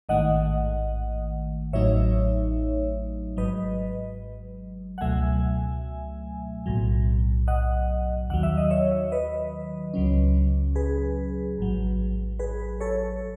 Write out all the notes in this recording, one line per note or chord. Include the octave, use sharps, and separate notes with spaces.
A1 G#2 D#3 A3 D#5 F#5
A1 A2 F#3 A3 D#4 C#5 E5
G#1 G#2 F#3 B4 D#5
F#5
C#2 B2 F#3 A3 E5 G#5
B1 A2 F#3
D#5 F#5
D#2 D#3 F#3 F#5
E5
D#5
C#5 E5
B4 D#5
C#2 C#3 F#3 C#4
G#4 B4
A1 G#2 F#3
G#4 B4
A4 C#5